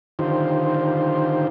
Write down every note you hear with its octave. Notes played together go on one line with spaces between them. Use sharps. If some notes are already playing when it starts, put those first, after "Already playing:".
D3 D#3 D#4 F4 G4 C5